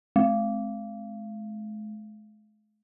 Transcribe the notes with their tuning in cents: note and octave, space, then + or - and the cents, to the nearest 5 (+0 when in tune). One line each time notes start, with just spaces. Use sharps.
G#3 +45